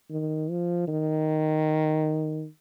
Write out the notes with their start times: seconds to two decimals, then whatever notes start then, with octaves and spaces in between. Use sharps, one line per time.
0.10 D#3
0.50 F3
0.88 D#3